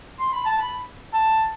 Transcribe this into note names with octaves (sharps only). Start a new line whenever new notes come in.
C6
B5
A5
B5
A5